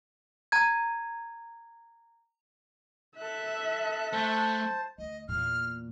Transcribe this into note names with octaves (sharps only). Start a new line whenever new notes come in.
A#5 G#6
A4 E5 F#6
A3 C5 A5
D2 D#5
E2 A#2 F6